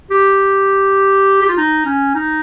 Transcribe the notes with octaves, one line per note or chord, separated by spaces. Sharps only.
G4
G4
F4
D#4
C#4
D#4